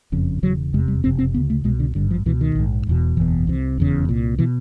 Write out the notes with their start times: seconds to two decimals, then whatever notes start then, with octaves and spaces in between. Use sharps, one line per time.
0.12 F#1 F2 C#3
0.42 E1 E2 C#3 F#3
0.73 F1 E2 C3 G#3
0.88 G3
1.04 F#1 F2 C3 C4
1.19 C4
1.34 D2 C#3 B3
1.50 A3
1.64 C2 B2 G#3
1.80 D3
1.95 G#1 G2 D3
2.11 F3
2.26 C#2 B2 E3
2.41 D#3
2.55 A#1 G#2
2.87 E1 E2 B2
3.17 F#1 E2 B2 E3
3.47 C2 C3
3.78 F1 E2 C#3
4.09 C2 A#2
4.39 B2 E3